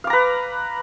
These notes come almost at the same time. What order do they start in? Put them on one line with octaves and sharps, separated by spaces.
F5 D6 A#5 B4